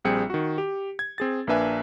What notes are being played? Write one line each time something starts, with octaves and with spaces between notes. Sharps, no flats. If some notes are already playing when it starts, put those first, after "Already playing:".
A#1 G3 C4 G#4 G5 C#7
D#3 F#4
G4
G#6
C4 G#4 A6
A#1 A#3 D4 B4 E5 G#5